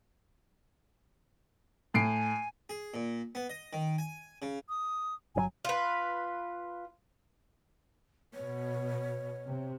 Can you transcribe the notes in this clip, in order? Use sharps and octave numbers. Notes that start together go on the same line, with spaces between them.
A2 G#5 C7 D7
G#4
A#2
B3
D#5
D#3
G#5
C#3
D#6
G1 C3 F#3 G#5
F4 B4
B2 C#5
C3